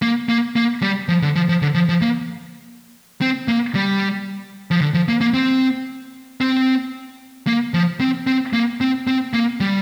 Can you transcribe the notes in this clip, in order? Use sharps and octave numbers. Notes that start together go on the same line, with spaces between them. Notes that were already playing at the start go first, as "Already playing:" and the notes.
A#3
A#3
A#3
G3
F3
D3
F3
F3
D3
F3
F3
A#3
C4
A#3
G3
F3
D3
F3
A#3
A#3
C4
C4
A#3
F3
C4
C4
A#3
C4
C4
A#3
G3